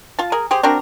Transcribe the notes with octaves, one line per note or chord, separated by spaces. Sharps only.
F4 A5
G#4 A#4
G4 G#4 C5
C4 D4 F#4 A#4